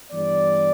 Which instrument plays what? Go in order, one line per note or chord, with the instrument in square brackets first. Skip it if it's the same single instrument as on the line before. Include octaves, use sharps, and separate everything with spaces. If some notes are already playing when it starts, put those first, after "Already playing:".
[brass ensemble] G2 E3 G3 B3 D5